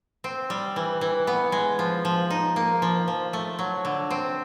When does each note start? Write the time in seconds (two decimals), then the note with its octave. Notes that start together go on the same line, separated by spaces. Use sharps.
0.24 C4
0.50 G3
0.76 E3
1.01 E3
1.27 B3
1.52 G#3
1.79 F3
2.05 F3
2.30 D#4
2.56 A#3
2.82 F3
3.08 F3
3.33 A3
3.59 F#3
3.85 D3
4.11 C4